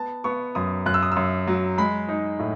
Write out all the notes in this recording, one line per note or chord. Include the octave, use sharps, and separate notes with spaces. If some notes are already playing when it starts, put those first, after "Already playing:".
Already playing: B3 A5
B3 C#6
F#2 D#6
F#2 F#6
E6
D#6
F#2 E6
F#3
G#3 B5
D#4
A2